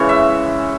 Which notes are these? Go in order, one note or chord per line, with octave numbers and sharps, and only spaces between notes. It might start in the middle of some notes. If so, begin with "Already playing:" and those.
Already playing: C#3 E3 G#3 C#5
E5